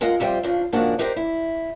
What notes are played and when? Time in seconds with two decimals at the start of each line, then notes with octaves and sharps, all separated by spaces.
0.01 G#3 F4 A#4 D#5 F#5
0.20 F2 C3 G3 C5 G5
0.43 C#3 F3 D4
0.72 G#2 C#3 F3 A#3 D4 F#4
0.99 D4 D#4 G4 A#4 C5
1.16 E4